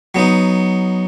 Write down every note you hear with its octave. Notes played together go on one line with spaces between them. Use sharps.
F#3 B3 D#4